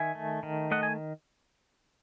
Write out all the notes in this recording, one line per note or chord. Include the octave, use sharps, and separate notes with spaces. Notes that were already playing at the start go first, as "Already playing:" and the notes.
Already playing: D#3 E5 G#5
A3
D#3
A3 D#5 F#5
G#5